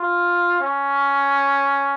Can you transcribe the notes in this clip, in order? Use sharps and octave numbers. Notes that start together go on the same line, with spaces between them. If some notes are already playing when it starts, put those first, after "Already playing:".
Already playing: F4
C#4